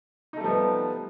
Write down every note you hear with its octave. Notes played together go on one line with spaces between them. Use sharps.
F3 G3 A3 B3 D#4